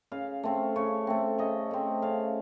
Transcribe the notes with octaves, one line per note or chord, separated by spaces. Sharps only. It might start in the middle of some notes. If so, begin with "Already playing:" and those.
C#3 F5
A3 C4
C#3 C#5
A3 C4
C#3 D#5
A3 C4
C#3 F5